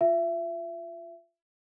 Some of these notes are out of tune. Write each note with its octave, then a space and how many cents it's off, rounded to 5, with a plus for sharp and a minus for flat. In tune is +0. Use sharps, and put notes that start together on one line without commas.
F4 +0 E5 +25